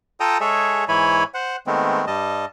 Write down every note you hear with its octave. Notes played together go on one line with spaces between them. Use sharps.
F4 A4 G5 A5 A#5 D#6
G#3 G#4 A4 C#5 E5
G#2 E3 E4 C#5 G#5 B5
C5 F#5
D#3 G#3 A3 B3 C4
G2 G3 D#5 A5